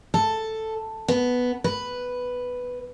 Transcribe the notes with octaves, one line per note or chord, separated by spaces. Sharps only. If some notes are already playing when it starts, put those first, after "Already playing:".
A4
B3
B4